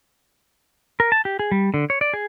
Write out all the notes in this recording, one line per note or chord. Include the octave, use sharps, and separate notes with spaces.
A#4
A5
G4
G#4
G3
D3
C#5
D5
G#4